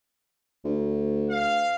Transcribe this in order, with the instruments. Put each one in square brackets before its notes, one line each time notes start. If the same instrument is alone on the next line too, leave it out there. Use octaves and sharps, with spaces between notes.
[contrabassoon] D2
[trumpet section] F5